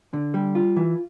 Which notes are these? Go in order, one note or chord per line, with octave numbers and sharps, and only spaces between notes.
D3
G3
F4
E3